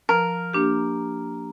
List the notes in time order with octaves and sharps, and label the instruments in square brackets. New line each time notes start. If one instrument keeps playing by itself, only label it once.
[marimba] F3 [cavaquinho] A#4
[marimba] A#3 D4 G4